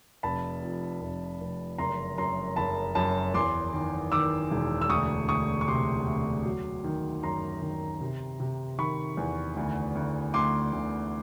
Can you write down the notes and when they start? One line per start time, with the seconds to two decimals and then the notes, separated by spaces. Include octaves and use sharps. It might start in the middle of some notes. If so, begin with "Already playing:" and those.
0.23 F1 A5 B5
0.62 F2
1.01 F1
1.40 F1
1.78 F#1 A#5 C6
2.18 F#2 A#5 C6
2.56 F#1 A5 B5
2.95 F#2 A5 B5
3.34 E2 C6 D6
3.73 D#3
4.12 D#3 D6 E6
4.51 E1
4.81 E6
4.89 D2 C#6 D#6
5.29 D2 C#6 D#6
5.61 C#6
5.67 C3 C6 D6
6.06 D2
6.45 F#3
6.84 D#3
7.23 F#2 A#5 C6
7.62 D#3
8.01 C3
8.40 C3
8.78 D#3 B5 C#6
9.17 E2
9.56 D2
9.95 D2
10.34 D2 C6 D6
10.73 D2